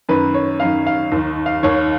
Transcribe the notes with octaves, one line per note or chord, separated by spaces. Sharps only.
F#2 D#3 B4
C#5
F#2 D#3 F5
F5
D#2 D#3
F5
D#2 D#3 C#5